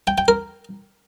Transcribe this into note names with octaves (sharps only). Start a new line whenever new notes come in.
G5
G5
A#4